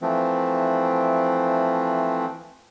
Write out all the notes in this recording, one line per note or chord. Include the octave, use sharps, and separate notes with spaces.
E3 F3 A3 C4